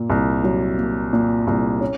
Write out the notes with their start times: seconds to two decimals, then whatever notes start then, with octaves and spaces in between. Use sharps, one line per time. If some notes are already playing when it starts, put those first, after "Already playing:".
Already playing: A#2 A#3
0.10 C2
0.44 F#3
0.78 A#3
1.13 A#2
1.47 C2
1.81 C#4